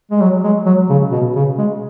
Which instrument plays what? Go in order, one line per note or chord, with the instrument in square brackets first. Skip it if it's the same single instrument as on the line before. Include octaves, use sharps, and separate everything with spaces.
[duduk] G#3
F#3
G#3
F#3
C#3
B2
C#3
G#3